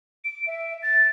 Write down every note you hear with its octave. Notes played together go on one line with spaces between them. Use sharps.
D7
E5
A6